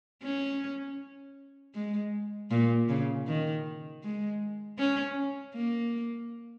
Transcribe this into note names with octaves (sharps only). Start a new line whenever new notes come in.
C#4
G#3
A#2
C#3
D#3
G#3
C#4
A#3